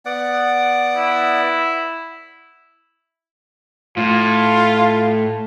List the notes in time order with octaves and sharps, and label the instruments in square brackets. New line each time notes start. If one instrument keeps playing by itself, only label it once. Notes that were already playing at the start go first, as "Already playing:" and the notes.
[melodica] B3 D5 F#5
[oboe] E4
[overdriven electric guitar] A2 [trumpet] F4